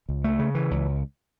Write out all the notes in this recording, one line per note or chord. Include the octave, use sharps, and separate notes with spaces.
C#2
A3
C#3
E3
C#2